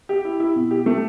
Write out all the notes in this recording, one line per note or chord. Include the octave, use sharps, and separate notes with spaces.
G4
E4
E4
B2
G4
A3